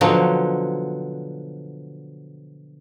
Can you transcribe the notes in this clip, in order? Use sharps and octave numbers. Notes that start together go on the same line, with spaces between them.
B2 D3 F3 F#3